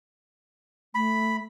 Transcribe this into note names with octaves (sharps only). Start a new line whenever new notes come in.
A3 B5